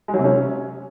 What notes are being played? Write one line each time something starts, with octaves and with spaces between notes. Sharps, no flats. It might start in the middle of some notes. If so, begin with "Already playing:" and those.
G#3
F#3
C3
C#4